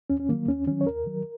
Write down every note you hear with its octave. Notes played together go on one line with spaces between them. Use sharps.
D#2 C#4
C#4
D#3 F#3 A#3
D#2 C#4
D#3 F#3 C#4
C#5
D#2 A#4
D#3 F#3